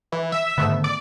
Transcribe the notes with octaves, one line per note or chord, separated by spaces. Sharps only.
E3
E5
G#2 D3 D#3 A3 B3
D5